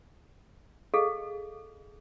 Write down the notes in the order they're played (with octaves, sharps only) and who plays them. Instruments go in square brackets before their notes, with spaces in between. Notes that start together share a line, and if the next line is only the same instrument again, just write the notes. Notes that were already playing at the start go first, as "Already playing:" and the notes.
[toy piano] G#4 A4 D#5 F5